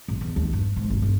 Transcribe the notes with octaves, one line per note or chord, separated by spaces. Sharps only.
A1
E2
D#2
G2
G#2
G#1
G1